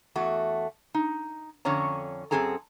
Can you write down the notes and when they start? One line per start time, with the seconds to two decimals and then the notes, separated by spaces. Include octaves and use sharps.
0.15 E2 A3 F#4
0.94 D#4
1.65 F2 D3 C#4 C#5 A#5
2.31 F#2 D#3 C4 G#4 A4 A#5